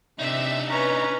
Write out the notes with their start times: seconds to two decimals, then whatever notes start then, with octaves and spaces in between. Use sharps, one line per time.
0.19 C3 D4 D#4 E5
0.70 C#4 B4 A#5